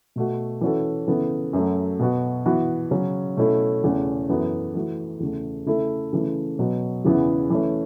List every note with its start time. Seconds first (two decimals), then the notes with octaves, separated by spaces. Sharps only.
0.16 B2 A3 F#4
0.61 E3 C#4 F#4 A4
1.08 C#3 E3 B3 A4
1.53 F#2 F#3 A3
1.99 B2 B3 F#4
2.46 E3 B3 F#4
2.91 C#3 F#3 C#4
3.37 B2 A3 C#4 E4 A4
3.83 E2 C#3 A3 C#4
4.29 F#2 E3 B3 F#4 A4
4.74 E3 A3 F#4
5.20 E2 C#3 A3
5.66 C#3 A3 E4 A4
6.13 C#3 E3 A3
6.59 B2 F#3 B3
7.04 E2 C#3 E3 B3 E4
7.50 E3 A3 C#4